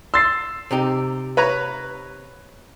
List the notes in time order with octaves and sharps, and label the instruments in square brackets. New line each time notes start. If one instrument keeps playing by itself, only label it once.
[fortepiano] C6 [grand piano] E6 A6 C7
[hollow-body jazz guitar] C3 D#4 G4
[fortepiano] B4 C#5 A#5